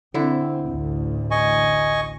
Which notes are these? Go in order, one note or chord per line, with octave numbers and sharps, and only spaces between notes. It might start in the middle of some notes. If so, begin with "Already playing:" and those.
D3 C4 E4
A1 D2
D#5 G#5 C#6